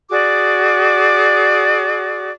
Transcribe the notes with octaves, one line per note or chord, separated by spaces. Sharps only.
F#4 G#4 D5 D6